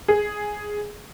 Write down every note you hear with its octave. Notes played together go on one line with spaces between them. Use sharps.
G#4